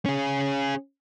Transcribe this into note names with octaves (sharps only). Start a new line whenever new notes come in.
C#4 G#4